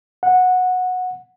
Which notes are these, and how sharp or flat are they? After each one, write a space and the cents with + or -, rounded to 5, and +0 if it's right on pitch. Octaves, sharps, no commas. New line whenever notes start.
F#5 -15